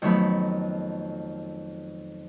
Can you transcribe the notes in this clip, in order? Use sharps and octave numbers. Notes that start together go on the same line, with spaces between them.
F2 D#3 F#3 A3 B3 B5